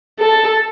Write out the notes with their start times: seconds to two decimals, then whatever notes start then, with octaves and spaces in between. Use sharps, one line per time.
0.20 A4